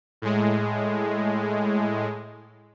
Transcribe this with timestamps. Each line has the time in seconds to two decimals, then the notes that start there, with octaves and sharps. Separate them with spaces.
0.22 A2 G#3